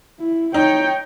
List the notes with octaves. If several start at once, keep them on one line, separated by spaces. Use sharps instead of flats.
E4
D#4 C#5 G5